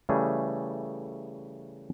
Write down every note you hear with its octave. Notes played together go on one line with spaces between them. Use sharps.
C#3 E3 G3 A3 G#4